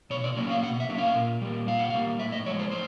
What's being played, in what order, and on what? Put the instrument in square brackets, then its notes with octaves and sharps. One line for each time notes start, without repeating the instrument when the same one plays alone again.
[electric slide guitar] B2 C#5
D5
F#3 A#3 C#4
F5
B2 F#5
E5
F#3 A#3 C#4
F5
A#2
G3 A#3
A#2 F5
F#5
G3 A#3 F5
A2 E5
D#5
F3 C#5
G#3
C5
A2 C5